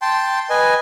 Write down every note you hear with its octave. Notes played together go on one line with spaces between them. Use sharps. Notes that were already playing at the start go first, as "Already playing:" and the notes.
G5 A5 C6
B4 D#5 G#5